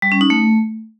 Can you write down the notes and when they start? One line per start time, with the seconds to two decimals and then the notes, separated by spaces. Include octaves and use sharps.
0.02 G3
0.12 C#4
0.21 D#4
0.30 A3